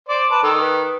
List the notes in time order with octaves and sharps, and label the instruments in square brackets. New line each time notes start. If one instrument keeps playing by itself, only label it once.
[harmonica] C5 D5 [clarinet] D6
[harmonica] B4 A5
[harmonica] D#3 [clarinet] A4
[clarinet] B4